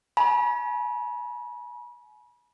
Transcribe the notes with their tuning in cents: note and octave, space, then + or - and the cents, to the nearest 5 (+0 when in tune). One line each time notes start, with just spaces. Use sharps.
G#5 +40 B5 -35